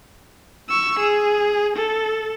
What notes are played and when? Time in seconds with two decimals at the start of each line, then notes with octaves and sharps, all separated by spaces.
0.69 C#6 E6
1.00 G#4
1.76 A4